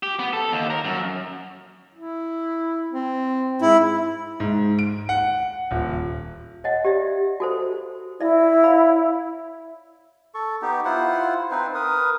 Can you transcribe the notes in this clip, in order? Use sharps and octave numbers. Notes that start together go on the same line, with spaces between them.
G4
B3
A4
D#2
A#4
F#2
E4
C4
G#2 E4
G#2
D7
F#5
D#1
C#5 D#5 F#5
G4 D5 E5
F#4 A4 C5
E4 D5 E5
C#5 F5 B5
A4 C#6
B3 D#4 G4
E4 F4 C5 F#5
C4 D#4 B4 C5
A#4 B4 D#6